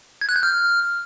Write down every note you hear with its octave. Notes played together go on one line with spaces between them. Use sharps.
G#6
F#6
G6
F6